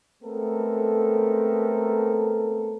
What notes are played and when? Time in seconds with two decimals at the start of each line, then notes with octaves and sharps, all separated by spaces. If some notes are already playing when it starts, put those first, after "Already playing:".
0.23 G#3 A3 B3 C4 A4 A#4